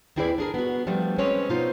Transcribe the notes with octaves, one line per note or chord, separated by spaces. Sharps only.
D#2 C4 E4 G#4 B4 D5
D4 G#4 A#4
B3 F#4
F3 G3 A3 B3 D4
G#3 C4 C#4 B4 C#5
B2 D#4 F4 C5